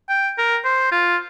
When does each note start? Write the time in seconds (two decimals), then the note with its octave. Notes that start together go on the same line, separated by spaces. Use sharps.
0.09 G5
0.38 A#4
0.65 C5
0.92 F4